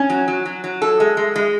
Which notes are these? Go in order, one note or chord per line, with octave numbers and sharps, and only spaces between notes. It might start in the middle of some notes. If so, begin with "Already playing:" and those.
Already playing: C#4
F#3
F#3
F#3
F#3
A4
G#3
G#3
G#3